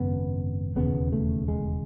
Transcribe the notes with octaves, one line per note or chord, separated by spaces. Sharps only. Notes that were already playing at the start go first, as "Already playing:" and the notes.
Already playing: G#1 F#2 C#3 B3
E1 D#2 C#3 B3
A3
G#3